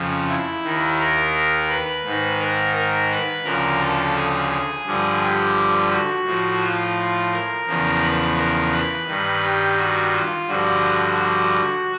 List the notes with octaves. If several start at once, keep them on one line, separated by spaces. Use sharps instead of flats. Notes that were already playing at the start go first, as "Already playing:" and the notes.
Already playing: F2 C#3 F3
E4
D#2 D#3
A#4
B4
G#2 D#3
A#4
A#4
B4
D2 C#3 F3 A#4
A4
G#4
G#4
G2 D3 F3
G4
F#4
A2 F3
F4
A#4
E2 C#3 F3
B4
A#4
B4
G2 D#3
G4
F#4
F4
G2 D3 F3 F#4
F#4